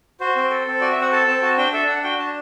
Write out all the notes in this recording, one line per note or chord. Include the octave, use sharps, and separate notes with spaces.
F#4 C5
C4
A4
C4
F#4 D5
E5
C4 F#5
A4 A5
C4 A5
F#4 A5
D4 G5
A4 E5
D4 F#5
F#4 G5
D4 A5